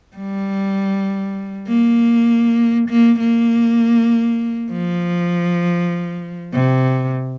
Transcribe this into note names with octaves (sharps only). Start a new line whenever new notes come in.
G3
A#3
A#3
A#3
F3
C3